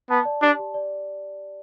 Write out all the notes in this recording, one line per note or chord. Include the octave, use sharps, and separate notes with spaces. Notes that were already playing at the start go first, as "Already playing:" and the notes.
B3 A5
D5
D4 G4
G4
D5